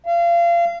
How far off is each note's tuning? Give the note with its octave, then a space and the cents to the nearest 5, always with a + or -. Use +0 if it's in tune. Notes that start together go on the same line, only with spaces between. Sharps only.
F5 -30